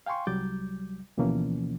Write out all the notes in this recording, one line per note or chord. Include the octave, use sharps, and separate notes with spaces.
F5 G5 G#5 C6 C#6
C2 F#3 G3 D6 G6 A6
D2 B2 E3 F3 A#3 C#4